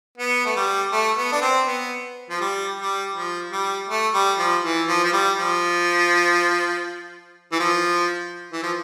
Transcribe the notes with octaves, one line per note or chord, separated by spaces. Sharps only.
B3
A3
G3
A3
B3
D4
C4
B3
F3
G3
G3
F3
G3
A3
G3
F3
E3
F3
F3
G3
F3
E3
F3
E3
F3